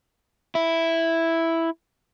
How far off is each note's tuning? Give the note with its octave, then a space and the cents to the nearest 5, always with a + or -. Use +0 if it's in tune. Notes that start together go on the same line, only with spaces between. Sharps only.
E4 +0